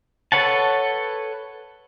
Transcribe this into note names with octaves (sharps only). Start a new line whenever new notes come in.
A4 B4 C#5 F#5 A5